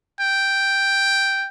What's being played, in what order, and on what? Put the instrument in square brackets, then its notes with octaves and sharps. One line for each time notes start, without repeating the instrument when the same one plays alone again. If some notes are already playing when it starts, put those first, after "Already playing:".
[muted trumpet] G5